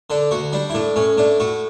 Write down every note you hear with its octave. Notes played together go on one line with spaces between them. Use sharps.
D3 D4
D2 F#4
G3 D4
E4
A2 D4
A2 C#4
A2 D4
A2 F#4